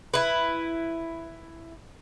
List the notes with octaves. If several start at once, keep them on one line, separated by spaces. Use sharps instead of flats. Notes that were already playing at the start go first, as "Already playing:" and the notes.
E4 B4